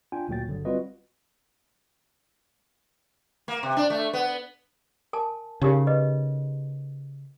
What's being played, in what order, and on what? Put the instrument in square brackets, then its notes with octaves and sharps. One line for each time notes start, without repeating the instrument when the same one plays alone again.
[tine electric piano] D4 F4 G5 G#5
D2 A#2 F#3 F#4 G5 A6
G1 D3 F#3
G3 C4 F4 F#4 B4 D#5
[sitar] A#3
C3
D4
A3
B3
[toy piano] A#4 G#5 A5
[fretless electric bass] C#3 [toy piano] D#4 G4 A#4
[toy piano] B4 D#5